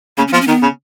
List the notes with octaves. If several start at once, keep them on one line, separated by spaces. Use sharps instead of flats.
C#3 A#3
C#4
F3 B3
C#4
D#3 B3
C#3